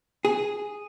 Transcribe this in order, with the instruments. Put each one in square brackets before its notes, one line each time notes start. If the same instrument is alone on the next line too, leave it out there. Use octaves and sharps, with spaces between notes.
[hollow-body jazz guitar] G#4